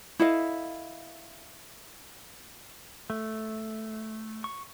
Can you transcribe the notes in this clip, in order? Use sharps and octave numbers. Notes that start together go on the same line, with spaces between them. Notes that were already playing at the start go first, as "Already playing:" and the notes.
E4 A4 D#5 F5
A3
C#6